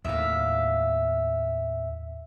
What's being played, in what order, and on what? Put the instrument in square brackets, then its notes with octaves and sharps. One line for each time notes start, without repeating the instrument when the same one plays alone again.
[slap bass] D#2 A2 [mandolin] E5 F5